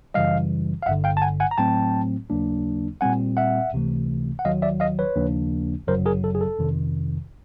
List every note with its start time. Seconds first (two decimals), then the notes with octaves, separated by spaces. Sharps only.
0.14 F#2 C#3 E3 G3 D#5 F5
0.83 F5
0.86 G1 G2 D3 E5 F#5
1.04 F5 G5
1.17 A5
1.22 F#5 G#5
1.40 F#5 G#5
1.51 A#5
1.58 A2 F#3 A3 C4 G5 A5
2.30 D#2 C#3 F#3 A#3 D4
3.01 A#2 G3 C4 F#5 G#5
3.37 E5 F#5
3.73 C#2 C3 E3 A3
4.39 F#5
4.44 D#2 D#3 F#3 D#5 F5
4.62 D5 E5
4.80 D#5 F5
4.99 B4 C#5
5.16 D#2 C#3 F3 A#3 D4
5.87 G1 F#2 C#3 F#3 A#4 C5
6.06 G#4 A#4
6.24 A4
6.35 G#4
6.41 A4
6.59 F2 C3 D#3